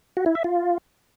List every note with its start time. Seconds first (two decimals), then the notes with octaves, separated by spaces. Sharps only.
0.17 F#4
0.26 E4
0.35 E5
0.44 F4